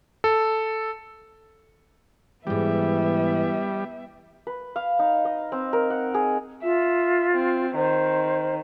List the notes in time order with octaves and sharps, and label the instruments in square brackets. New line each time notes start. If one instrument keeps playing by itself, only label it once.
[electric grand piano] A4
[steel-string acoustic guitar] F2 G#2 [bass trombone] E3 [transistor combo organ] G3 [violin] B3 E5
[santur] B4
F5
D#4
D#5
C4
A#4
F#5
G#4
[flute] F4 [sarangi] E5
[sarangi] C4
[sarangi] D#3 [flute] C5